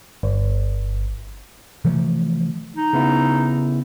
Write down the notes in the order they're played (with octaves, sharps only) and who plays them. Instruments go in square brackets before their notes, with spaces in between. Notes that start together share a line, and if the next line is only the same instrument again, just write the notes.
[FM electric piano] G1
[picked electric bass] C3 E3 F3 A3
[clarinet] D#4
[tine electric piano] C#3 B3 E4